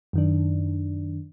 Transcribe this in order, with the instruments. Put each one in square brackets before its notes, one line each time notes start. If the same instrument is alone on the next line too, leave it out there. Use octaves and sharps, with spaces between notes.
[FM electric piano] F#2 D#3 D4